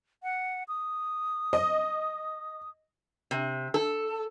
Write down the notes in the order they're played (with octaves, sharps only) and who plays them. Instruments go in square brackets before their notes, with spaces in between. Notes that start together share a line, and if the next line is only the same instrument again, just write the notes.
[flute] F#5
D#6
[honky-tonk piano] D#5
[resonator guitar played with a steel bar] C3
A4